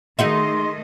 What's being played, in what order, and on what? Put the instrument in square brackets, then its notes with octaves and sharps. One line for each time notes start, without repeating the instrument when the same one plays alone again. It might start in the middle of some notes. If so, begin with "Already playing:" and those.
[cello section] D#3 A3 D#5 [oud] D#4 F#4 E5 [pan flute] G#4 [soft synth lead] C6